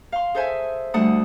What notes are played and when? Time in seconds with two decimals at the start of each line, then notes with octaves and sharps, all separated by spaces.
0.12 F5 C6
0.34 G#4 A4 C5 E5 G#5
0.94 D2 G3 A3 F#5 A5 D#6